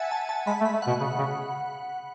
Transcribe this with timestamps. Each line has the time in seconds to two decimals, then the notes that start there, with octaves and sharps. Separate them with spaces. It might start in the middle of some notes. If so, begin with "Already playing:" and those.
Already playing: E5 F#5 G#5 A5
0.11 A5
0.29 A5
0.47 G#3 B5
0.61 A3
0.65 B5
0.73 A3
0.82 B2 F#5
1.00 C#3
1.19 C#3